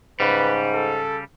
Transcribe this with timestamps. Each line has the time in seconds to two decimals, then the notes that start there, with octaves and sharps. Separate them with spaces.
0.20 G#2 C#3 G3 B4
0.74 A4